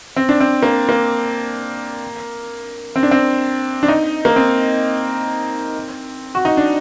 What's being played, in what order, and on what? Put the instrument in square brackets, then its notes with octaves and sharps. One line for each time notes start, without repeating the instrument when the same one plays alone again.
[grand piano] C4
D4
C4
A#3
A#3
C4
D4
C4
D4
D#4
A#3
C4
F#4
D#4
D4